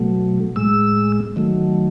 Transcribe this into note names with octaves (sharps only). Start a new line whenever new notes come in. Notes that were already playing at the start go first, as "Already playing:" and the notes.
Already playing: B2 F#3 A3
A2 G#3 E6
D#3 F#3 A3